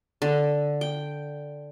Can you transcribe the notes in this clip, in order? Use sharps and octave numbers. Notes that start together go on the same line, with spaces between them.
D3
G5